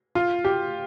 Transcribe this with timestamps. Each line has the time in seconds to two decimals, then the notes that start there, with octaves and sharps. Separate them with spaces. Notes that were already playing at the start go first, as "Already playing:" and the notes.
0.15 F4
0.44 G4